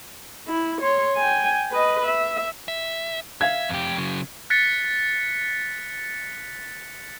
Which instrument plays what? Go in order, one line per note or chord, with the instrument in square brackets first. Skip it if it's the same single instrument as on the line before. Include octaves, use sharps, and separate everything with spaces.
[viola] E4
C#5 C6
G5 G#5
B4 D#5
E5
[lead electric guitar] E5
[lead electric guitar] E5 [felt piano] F5 G#6
[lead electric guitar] F2 G4
C#3 F#3
[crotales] F#6 A6 B6 C#7